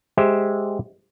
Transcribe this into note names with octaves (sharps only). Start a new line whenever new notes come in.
G#3 G4 C5 E5